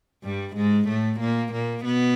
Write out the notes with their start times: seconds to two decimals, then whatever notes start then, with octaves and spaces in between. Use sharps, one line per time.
0.24 G2 G3
0.56 G#2 G#3
0.88 A2 A3
1.20 A#2 A#3
1.53 A#2 A#3
1.85 B2 B3